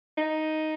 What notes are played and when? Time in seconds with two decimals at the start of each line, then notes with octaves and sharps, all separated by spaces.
0.17 D#4